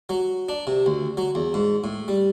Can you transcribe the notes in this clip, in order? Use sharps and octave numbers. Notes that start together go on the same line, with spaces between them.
F#3
D4
C3
D2
F#3
E2
G#2
A2
G3